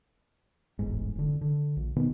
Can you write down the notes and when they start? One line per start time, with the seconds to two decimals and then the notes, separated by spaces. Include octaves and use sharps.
0.79 E1 A1 G#2
1.15 F1 D3
1.41 D3
1.77 A#1
1.96 B2 D#3 B3